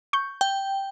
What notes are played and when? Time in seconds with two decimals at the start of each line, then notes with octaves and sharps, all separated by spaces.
0.13 C#6 G6
0.41 G5